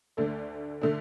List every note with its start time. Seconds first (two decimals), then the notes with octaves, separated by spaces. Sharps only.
0.17 D2 D3 A3 D4
0.81 D3 A3 D4